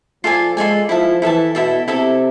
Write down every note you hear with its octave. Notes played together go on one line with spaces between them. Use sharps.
F3 F4 A4 D5 G#5
G#3 F4 A4 D5 G#5
F3 E4 A4 E5 A5
E3 E4 A4 E5 A5
B2 E4 A4 E5 A5
C3 E4 A4 E5 A5